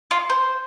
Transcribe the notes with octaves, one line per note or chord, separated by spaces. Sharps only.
F4
C5